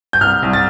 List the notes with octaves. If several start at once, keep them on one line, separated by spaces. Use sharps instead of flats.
G6
C2 F6
C2
A6